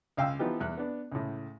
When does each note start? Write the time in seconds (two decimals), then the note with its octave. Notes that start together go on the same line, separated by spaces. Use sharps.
0.17 C#2 F5 G5 E6
0.39 E3 F3 B3 D#4 F4 G4
0.61 E2 F#6
0.77 B3 D4
1.12 C#2 A2